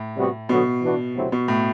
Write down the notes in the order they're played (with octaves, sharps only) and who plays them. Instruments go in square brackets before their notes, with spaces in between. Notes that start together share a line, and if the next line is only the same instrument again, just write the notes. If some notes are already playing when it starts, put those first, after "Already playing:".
Already playing: [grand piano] A2
[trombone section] C3 G3 B3 F#4
[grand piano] B2 [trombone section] D3 F#3 B3 F#4
[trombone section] E3 B3 D4 F#4 B4
D2 C3 F#3 C4 E4
[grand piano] B2
A2